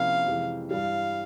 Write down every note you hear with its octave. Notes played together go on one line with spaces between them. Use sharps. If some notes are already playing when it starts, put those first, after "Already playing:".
Already playing: C3 F3 A#3 C#4 E4 F5
F2 C3 E3 G#3
G2 E3 G3 F5